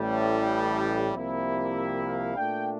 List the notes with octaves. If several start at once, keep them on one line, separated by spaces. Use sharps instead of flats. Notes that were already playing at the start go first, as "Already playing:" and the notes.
Already playing: A1 A2 G3
C2 C3 F3 A#3 E4
E5
F5
A#2 A3 D4 G5